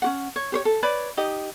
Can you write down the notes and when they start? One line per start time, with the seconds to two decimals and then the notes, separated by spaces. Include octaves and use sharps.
0.02 C#4 F#4 F#5
0.36 C#5
0.52 G4 C5 C#5
0.65 A4
0.83 B4 C#5 D5 B5
1.17 D#4 G4 D#5